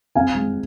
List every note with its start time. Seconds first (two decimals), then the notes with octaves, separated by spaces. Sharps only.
0.15 C4 F5 G#5
0.35 G#3